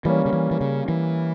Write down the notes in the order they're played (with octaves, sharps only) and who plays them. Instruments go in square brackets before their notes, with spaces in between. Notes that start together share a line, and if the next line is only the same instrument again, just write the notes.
[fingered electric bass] E3 [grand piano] G3 A#3 C#4
[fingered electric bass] C#3
E3
E3
C#3
E3